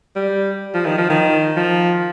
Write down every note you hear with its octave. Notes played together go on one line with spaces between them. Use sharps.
G3
F3
D#3
F3
D#3
F3